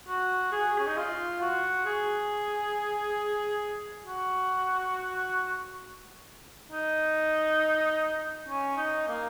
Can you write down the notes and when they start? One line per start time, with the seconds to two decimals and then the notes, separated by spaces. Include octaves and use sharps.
0.08 F#4
0.52 G#4
0.78 C#4
0.87 D#4
0.98 F4
1.41 F#4
1.85 G#4
4.07 F#4
6.72 D#4
8.48 C#4
8.77 D#4
9.08 A#3